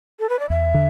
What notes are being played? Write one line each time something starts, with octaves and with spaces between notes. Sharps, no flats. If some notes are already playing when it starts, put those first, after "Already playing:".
A4
B4
D5
E2 E5
D3